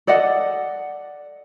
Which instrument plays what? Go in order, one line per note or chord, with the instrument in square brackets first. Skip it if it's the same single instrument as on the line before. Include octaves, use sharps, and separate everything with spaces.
[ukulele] A4 D5 D#5 F#5